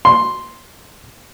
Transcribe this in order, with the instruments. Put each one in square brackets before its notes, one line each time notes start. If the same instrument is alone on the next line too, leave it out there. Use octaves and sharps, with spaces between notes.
[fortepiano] C6